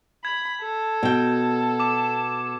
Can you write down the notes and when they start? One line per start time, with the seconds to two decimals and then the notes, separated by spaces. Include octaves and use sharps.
0.25 B5 G#6
0.62 A4
1.03 B2 G5
1.80 D6 E7